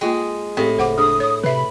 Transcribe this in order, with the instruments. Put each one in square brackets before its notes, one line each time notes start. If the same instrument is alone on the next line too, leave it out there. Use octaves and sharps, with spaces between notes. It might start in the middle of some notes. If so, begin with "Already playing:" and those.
[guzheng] G#3 [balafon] A#3 F4 G5
[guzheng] A2 [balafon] C4 G4
[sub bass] F#1 [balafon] C5 F#5 D6
[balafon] D4 G#4 [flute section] D#6
[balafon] C#5 [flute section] D#6
[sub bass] C3 [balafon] B4 E5 [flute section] B5